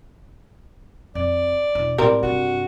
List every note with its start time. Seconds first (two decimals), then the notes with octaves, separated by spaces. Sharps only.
1.15 F2 D5
1.75 E1
1.98 A2 G3 G#3 C4 A#4
2.23 G2 C3 F#4